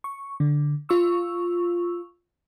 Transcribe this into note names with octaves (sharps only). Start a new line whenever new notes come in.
C#6
D3
F4 C#6 E6